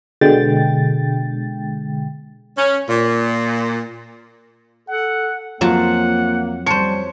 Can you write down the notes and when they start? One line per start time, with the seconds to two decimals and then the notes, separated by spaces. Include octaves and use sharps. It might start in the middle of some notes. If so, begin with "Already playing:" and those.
0.21 B2 D3 G#3 G5 A6
2.58 C#4
2.89 A#2
4.89 A4 F#5
5.61 F2 F#3 A#3 F4 F#5 A5
6.66 G3 C5 C#5 A5 C#7